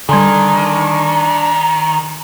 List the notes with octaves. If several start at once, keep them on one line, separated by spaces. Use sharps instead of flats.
D3 D#3 G3 D4 G#5 C6 G#6